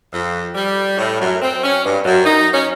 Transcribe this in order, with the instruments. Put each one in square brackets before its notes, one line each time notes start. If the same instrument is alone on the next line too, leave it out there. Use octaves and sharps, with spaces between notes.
[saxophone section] F2
G3
A2
F#2
C4
C#4
G2
F#2
D#4
C#4